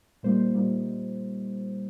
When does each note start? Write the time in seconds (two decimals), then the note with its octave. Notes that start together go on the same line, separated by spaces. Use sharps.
0.23 A#2 G3 A#3 D#4 C5
0.40 C5
0.54 A#2 G3 A#3 D#4